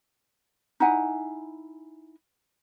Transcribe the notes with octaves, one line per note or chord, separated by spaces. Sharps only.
D#4 E4 F#5 G#5